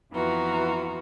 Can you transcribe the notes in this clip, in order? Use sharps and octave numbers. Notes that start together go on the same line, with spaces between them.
F2 E3 B3 F4 F#4 A#5